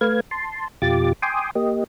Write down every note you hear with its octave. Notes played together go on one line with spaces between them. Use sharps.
A3 B4 F5 G#6
A5 C6
F2 B2 F4 G4 D6 A6
G5 G#5 C6 D6 D#6
A#3 G4 D#5